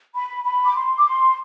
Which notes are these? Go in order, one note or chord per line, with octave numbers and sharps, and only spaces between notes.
B5
B5
D6
C6
D6
C6